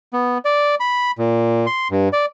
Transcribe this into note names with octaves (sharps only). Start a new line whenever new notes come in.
B3
D5
B5
A#2
C6
G2
D5